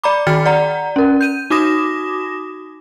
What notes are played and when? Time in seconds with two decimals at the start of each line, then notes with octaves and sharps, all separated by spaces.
0.04 D5 A#5 B5 D6
0.27 D#3 F#4 G5 F6 A6 C#7
0.46 D5 F#5 A#5
0.96 C#4 A#4
1.21 G6 D#7
1.50 D#4 F#4 D6 D#6 A#6 E7